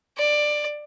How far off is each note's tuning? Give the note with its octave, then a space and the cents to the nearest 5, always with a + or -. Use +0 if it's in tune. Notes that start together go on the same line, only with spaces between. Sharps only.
D5 +15